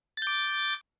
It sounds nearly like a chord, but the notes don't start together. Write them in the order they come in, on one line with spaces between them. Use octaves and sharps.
A6 G6 D6